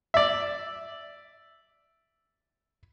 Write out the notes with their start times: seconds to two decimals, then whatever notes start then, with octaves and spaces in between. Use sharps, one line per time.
0.14 D5 E5